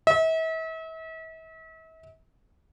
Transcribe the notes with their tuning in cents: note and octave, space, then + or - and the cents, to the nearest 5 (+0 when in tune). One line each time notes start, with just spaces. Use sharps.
E5 -40